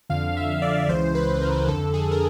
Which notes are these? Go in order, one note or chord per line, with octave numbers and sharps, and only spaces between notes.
F2 D3 F5
E5
D5
C#2 C#3 E3 C5
B4
A#4
F2 D3 A4
G#4
A#4